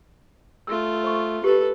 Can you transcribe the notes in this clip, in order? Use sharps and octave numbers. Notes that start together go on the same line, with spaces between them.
A3 F4 E6
C5 C#6
G4 A4 B4